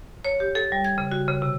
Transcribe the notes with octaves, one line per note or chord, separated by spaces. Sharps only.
C#5
G4
A4
G3
G#6
C#3
F#4
C#3
C3